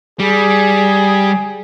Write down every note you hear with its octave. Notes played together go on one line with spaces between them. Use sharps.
G3 G#4